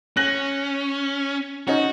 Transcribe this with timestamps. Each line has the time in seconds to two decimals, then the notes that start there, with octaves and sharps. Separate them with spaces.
0.17 C#4 F#6 A#6 F#7
1.68 C#4 D#4 F#4